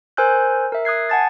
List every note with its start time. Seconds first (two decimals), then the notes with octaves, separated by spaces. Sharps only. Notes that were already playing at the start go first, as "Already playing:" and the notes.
0.17 A#4 C5 G#5 E6 F#6 G6
0.72 A#4 E5
0.85 D#6 F#6 G#6 C7
1.09 F#5 G#5 A5 D#6 A6